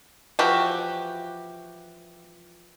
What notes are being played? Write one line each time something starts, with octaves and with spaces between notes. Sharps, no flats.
E3 F3 F#4 G4